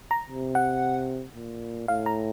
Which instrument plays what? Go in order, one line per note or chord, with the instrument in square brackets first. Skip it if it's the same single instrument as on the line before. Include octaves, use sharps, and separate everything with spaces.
[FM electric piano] A#5
[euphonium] C3
[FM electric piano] F#5
[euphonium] A#2
[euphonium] A2 [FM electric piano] F5
[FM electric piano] A#5